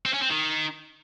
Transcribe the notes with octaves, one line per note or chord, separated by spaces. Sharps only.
C4
C#4
C4
D#3